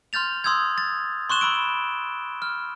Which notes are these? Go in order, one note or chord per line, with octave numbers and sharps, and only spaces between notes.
C6 F6 G6 A6 F7
C6 D#6 E6 G6 G#6
A6
C6 C#6 F#6 E7 G7
B5 E6 D7
F6